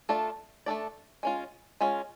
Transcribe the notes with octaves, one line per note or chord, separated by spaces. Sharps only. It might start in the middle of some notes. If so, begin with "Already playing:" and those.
A3 D4 F4 A4 D5
A3 D4 F4 A4 D5
G#3 C#4 F4
G#3 C#4 F4